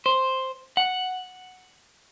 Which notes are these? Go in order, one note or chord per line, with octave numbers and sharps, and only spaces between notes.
C5
F#5